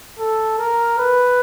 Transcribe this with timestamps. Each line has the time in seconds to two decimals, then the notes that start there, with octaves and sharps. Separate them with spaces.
0.19 A4
0.59 A#4
0.98 B4